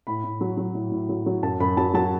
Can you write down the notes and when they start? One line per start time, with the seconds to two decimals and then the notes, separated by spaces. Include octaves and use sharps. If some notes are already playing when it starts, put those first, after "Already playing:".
0.07 A2 B5
0.24 A2
0.41 F#3
0.57 F#3
0.75 A2
0.91 A2
1.09 F#3
1.26 F#3
1.43 F#2 A5
1.60 F#2 B5
1.77 F#3 A5
1.94 F#3 A5